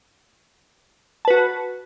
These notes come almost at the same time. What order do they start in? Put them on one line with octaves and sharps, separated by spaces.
A5 B4 F#4